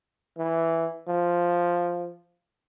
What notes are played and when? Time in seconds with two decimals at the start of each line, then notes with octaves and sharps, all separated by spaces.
0.38 E3
1.08 F3